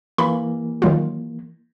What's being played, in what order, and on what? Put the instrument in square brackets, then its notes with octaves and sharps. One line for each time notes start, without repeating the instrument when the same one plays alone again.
[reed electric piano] E3 A#3 [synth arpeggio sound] B5
[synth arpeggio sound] D#3 F#3 F4